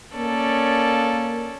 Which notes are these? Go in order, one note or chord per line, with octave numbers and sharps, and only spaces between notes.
A#3 C#4 A4 D5